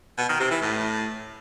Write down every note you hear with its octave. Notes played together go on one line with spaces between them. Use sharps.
B2
D#3
C3
E3
A2